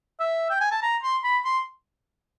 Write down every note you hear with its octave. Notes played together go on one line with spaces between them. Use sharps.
E5
G5
G#5
A5
A#5
C6
B5
C6